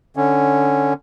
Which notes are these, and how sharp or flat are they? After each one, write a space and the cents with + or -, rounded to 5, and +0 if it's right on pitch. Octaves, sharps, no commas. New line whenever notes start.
D3 +0 C#4 +0